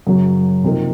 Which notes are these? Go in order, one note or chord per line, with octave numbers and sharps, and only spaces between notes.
F#2 C#3 F#3
C3 F3 A#3 D#4